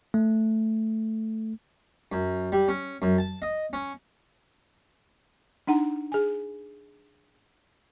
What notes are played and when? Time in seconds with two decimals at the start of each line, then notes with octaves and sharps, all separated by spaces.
0.14 A3
2.12 F#2
2.52 G3
2.68 C#4
3.02 F#2
3.18 A5
3.42 D#5
3.73 C#4
5.67 D4 D#4 F#5 A#5
6.12 G#4 G#5